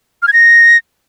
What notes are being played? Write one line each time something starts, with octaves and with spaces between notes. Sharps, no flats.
F6
G#6
A#6